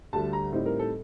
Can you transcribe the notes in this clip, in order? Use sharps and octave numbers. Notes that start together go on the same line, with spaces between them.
D2 D3 G3 A5
A#5
A2 G3 C4 D#4
A#4
A4